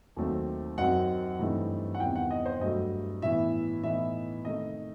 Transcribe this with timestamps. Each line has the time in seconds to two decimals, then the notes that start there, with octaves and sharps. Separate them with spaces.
0.16 D#2 D#3 F#3 A3 C4
0.78 F#2 F#3 C4 D#4 F#5
1.39 G2 E3 A3 C4 D#4
1.95 F#5
2.00 E2 C3 D#3 G3 B3 G5
2.16 F#5
2.31 D#5
2.45 C5
2.61 G2 F#3 A3 D#5
3.22 A2 E3 B3 E5
3.83 A2 E3 B3 D#4 E5
4.45 C3 D#3 A3 D#4 D#5